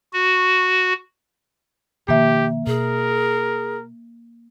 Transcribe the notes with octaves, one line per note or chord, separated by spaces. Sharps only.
F#4
B2 D#3 F3 A#3 G4 E5
B2 G#4 A#4